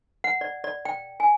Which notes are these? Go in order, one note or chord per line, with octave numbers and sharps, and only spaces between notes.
F#5
D5
D5
G5
G#5